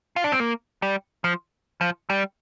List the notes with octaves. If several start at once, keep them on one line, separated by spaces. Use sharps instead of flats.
F4
D4
C4
A#3
G3
F3
F3
G3